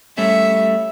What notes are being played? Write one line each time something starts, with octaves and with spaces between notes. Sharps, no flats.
G3 A3 C#4 E5